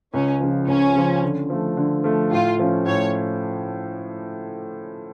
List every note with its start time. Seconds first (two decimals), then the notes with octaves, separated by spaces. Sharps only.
0.14 C#2 C#4
0.41 C#3 F3
0.68 C#2 C#4
0.96 C#3 F3
1.23 D3
1.50 F3 A3
1.77 D3
2.04 F3 A3
2.31 A2 F4
2.59 F3 C#4
2.86 A2 C#5